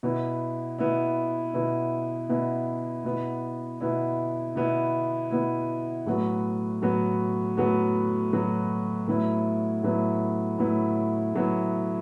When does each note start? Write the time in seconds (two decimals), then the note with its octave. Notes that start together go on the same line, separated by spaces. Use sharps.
0.03 B2 B3 E4
0.79 B2 B3 E4
1.54 B2 B3 E4
2.29 B2 B3 E4
3.04 B2 B3 E4
3.80 B2 B3 E4
4.56 B2 B3 E4
5.31 B2 B3 E4
6.06 A2 F#3 B3 F#4
6.82 A2 F#3 B3 F#4
7.57 A2 F#3 B3 F#4
8.32 A2 F#3 B3 F#4
9.08 A2 F#3 B3 E4
9.83 A2 F#3 B3 E4
10.58 A2 F#3 B3 E4
11.34 A2 F#3 B3 E4